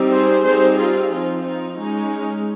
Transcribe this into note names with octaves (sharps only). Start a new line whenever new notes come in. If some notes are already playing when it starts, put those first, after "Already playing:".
Already playing: G3 C4 D#4
G#4 C5
G3 C4 D#4 G#4 C5
F4 G#4
F3 C4 D#4 F4
D#4
G#3 C#4 D#4